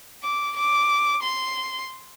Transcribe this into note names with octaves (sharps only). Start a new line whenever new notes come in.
D6
D6
C6